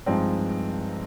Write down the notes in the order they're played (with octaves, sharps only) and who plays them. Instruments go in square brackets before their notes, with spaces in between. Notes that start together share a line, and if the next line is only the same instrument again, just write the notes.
[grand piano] G2 F3 G#3 C4 D#4